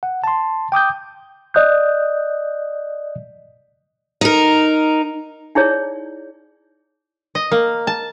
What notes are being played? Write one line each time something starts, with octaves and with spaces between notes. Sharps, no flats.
F#5
A5 C6
G5 D6 D#6 G6
D5 D#5 D#6 F#6 G6
D#4 A#4
D#4 E4 G#4 C#5 D5
D#5
A#3
A5